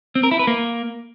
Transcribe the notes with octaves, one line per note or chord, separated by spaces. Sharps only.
C4
A#4
E4
B4
A#3